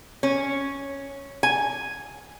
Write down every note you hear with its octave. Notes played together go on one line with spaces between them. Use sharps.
C#4
G#5